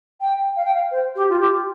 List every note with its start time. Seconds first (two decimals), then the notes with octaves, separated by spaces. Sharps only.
0.21 G5
0.56 F5
0.64 G5
0.74 F5
0.91 C5
1.16 G4
1.30 F4
1.39 G4